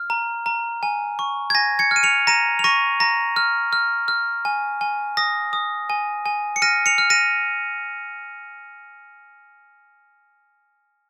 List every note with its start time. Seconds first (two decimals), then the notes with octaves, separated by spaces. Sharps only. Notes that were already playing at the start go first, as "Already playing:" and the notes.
Already playing: F6
0.10 A#5
0.46 A#5
0.83 G#5
1.19 C#6
1.50 G#6
1.55 G#5 A#6
1.79 G#6 C#7
1.91 F6 D#7
2.03 C#7 F7
2.27 A#5 A#6 D#7
2.59 F7
2.64 C#6 A#6 D#7
3.00 A#5 A#6
3.36 F6
3.73 F6
4.08 F6
4.45 G#5
4.81 G#5
5.17 D#6 A#6
5.53 D#6
5.90 G#5
6.26 G#5
6.56 C#7
6.62 F6 A#6 D#7
6.86 C#7 F7
6.98 F6
7.10 A#6 D#7